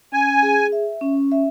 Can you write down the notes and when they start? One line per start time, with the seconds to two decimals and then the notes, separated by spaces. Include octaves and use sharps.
0.12 C#4 G#5
0.43 G#4
0.72 E5
1.01 C#4
1.32 E5